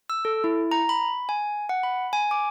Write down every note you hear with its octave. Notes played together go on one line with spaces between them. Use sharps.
E6
A4
E4
A#5
B5
G#5
F#5
B5
G#5
D6